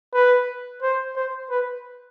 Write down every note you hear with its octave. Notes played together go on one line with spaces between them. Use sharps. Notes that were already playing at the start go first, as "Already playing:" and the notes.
B4
C5
C5
B4